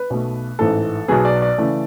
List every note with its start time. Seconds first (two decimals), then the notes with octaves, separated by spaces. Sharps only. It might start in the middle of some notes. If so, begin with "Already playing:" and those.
Already playing: B4
0.10 B1 B2 A3
0.59 A1 G#2 E3 A3 A4
1.08 B1 B2 F#3 B3 G#4
1.25 D5
1.42 D5
1.58 C#3 E3 A3